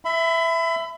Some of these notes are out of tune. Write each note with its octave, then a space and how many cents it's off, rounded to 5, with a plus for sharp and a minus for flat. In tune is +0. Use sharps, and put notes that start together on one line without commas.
E5 +5 B5 +30